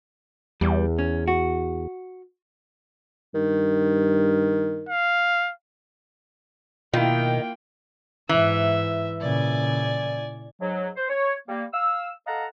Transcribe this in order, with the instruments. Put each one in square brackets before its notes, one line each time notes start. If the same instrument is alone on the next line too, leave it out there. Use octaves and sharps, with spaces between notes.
[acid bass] E2 [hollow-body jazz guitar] G3
[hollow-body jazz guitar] C#4
F#4
[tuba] G2 [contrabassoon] D#3
[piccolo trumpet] F5
[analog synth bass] B2 [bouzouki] D#3 [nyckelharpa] A#3 G5 [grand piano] E4 F4
[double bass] G#2 [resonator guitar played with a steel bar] E3 [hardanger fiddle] E5
[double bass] A#2 C#3 [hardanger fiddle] D5 G#5
[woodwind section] G#2 F#3
C5
C#5
G3 A#3
F5 E6
A4 D#5 F5 F#5 A5 A#5